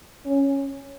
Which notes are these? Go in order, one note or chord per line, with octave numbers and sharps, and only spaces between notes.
C#4